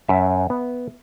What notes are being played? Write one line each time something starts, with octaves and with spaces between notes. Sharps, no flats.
F#2 E5
B3